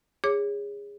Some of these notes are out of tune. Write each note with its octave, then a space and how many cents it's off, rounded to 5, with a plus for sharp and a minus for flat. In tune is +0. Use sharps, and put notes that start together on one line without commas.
G#4 -25 C#5 +5 D6 +0